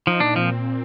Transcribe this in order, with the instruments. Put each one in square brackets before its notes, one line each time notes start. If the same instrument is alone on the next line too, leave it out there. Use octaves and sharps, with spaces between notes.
[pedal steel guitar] F3 [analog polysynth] D#4
[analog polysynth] A#2 [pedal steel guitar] D4
[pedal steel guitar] F3 [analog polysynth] C4